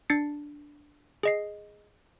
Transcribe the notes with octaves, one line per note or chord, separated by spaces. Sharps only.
D4 A6 C7 C#7
G#4 D#5 C7